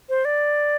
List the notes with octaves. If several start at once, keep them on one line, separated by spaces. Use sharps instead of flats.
C5
D5